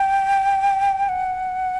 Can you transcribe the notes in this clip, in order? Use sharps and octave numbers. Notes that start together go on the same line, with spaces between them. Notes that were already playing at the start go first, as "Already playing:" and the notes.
Already playing: G5
F#5